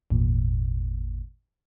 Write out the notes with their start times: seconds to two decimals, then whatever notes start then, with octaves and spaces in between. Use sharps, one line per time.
0.10 G#1 E2 A#2